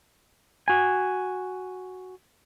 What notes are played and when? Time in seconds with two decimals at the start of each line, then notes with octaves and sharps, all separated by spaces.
0.68 F#4 G#5